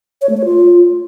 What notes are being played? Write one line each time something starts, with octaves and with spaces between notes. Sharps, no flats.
C#5
A3
C#5
F4